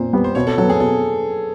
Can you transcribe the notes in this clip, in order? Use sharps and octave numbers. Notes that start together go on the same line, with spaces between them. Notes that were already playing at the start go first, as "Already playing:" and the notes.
Already playing: A#2 C5
G3 B3
C5
B2 C#5
A4
F#3 B3 A4
G#4
B2 A4